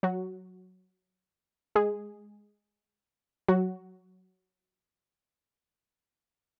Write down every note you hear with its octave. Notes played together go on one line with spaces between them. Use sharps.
F#3 F#4
G#3 G#4
F#3 F#4